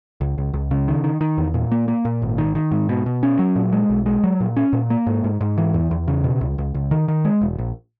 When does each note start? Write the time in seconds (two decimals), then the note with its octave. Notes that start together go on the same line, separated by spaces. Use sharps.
0.21 C#2
0.38 C#2
0.53 C#2
0.71 C#3
0.88 D#3
1.04 D#3
1.21 D#3
1.38 E2
1.54 A#2
1.72 A#3
1.88 A#3
2.05 A#2
2.22 G#1
2.38 D#3
2.55 D#3
2.71 G#2
2.89 B2
3.06 B2
3.23 C#4
3.39 F#3
3.56 A#2
3.73 G#3
3.90 B1
4.06 G#3
4.24 F#3
4.40 A#2
4.56 C#4
4.73 A#2
4.90 A#3
5.07 G#2
5.24 G#2
5.41 G#2
5.58 E3
5.74 E2
5.91 E2
6.08 C#3
6.24 B2
6.41 C#2
6.58 C#2
6.75 C#2
6.91 D#3
7.08 D#3
7.25 G#3
7.41 E1
7.58 A#1